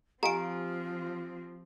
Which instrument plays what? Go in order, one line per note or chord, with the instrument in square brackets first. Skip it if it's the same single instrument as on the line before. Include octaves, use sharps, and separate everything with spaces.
[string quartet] F3 C4 [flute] F4 [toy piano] G4 F5 G#5 [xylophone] A#5 D7